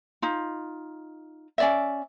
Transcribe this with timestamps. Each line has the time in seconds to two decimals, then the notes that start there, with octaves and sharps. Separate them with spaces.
0.22 D#4 F4
1.58 C#4 D5 E5